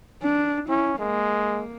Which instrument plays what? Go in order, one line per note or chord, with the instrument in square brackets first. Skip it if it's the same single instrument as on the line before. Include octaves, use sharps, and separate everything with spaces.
[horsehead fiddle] D4
[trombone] C#4 [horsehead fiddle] E4
[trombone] G#3 [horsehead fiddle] A#3